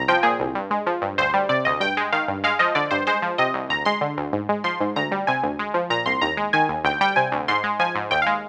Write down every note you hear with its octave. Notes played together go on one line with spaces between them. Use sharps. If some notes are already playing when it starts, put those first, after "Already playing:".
Already playing: C2 A#5
F3 G5
A#2 G#4
C2
G2
G#3
F3
G2
D2 C5
G3
C3 D5
D2 D#5
G2 G5
G#3
D#3 F5
G2
G#3 F5
F3 D#5
D3 D5
G2 C5
G#3 C5
F3
C3 D#5
C2
D2 A#5
G#3 C6
D3
D2
G#2
G#3
F3 C6
G#2
D2 A#5
G3
C3 G#5
D2
G#3
F3
A#2 A#5
C2 C6
D#2 A#5
G#3
D#3 G#5
D#2
D2 G5
G3 G5
C3 G#5
D2
G#2 C6
G#3
F3 G#5
G#2
D#2 G5
F5
G#3